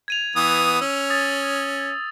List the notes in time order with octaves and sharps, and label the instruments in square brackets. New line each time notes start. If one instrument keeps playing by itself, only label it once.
[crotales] G#6 D#7 F7
[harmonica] E3 B3 D#6
[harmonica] C#4 [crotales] E6
[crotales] D#6 A6